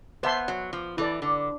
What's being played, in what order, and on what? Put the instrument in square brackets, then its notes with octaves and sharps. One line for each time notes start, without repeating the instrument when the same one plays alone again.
[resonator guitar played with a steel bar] B3 [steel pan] C5 E5 A5 C6
[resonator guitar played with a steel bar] F#3
F3
[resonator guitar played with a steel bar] E3 [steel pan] E4 A4 D5
[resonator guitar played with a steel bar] D3